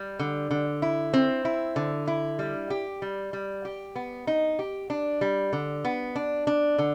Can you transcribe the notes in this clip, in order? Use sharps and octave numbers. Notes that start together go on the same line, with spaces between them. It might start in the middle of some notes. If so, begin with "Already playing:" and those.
Already playing: G3
D3
D3
E4
C4
E4
D3
E4
G3
G4
G3
G3
G4
B3
D#4
G4
D4
G3
D3
B3
D4
D4
D3